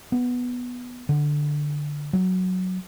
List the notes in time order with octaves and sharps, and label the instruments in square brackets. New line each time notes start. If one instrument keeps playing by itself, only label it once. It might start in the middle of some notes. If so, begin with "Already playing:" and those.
[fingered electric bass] B3
D3
F#3